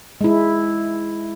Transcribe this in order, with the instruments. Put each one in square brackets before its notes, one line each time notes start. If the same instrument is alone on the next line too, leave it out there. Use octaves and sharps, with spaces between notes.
[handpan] G#3 E4